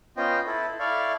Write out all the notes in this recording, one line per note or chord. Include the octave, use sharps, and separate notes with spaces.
B3 C#4 F4 C5 D#5 G5
E4 A4
E4 A4 D5 F5 C#6